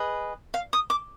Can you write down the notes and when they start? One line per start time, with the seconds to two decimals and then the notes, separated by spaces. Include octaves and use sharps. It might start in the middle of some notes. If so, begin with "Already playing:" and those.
Already playing: G#4 B4 D#5
0.54 F5
0.73 D#6
0.90 D6